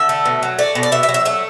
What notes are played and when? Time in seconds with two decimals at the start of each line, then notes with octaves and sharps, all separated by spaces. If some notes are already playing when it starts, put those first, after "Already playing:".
Already playing: D3 E5
0.09 A3
0.26 B2
0.43 F#3
0.58 A3 D5
0.75 B2
0.83 D5
0.92 B2 E5
1.03 E5
1.09 F#3
1.14 E5
1.25 A3 E5